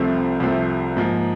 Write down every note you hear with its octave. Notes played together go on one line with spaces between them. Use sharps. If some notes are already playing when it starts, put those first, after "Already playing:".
Already playing: C2 C3 F3 A3 C4
C2 C3 F3 A3 C4
G#2 F3 A#3